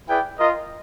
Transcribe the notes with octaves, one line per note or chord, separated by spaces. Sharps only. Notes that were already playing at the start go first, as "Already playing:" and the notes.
E4 G#4 B4 D5 G5
F4 A#4 D#5